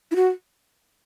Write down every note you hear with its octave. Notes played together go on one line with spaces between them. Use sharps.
E4
F#4